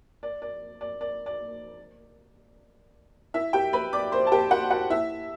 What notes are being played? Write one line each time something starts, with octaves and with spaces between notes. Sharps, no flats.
D5
D5
D5
D5
D5
E4 E5
G4 G5
B4 B5
D5 D6
C5 C6
A5
G4 G5
F#4 F#5
F#4 F#5
E4 E5